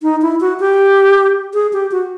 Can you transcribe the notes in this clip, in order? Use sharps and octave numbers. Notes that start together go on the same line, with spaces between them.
D#4
E4
F#4
G4
G#4
G4
F#4